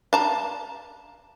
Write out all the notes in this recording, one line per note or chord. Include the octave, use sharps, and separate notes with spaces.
F5 A5 A#5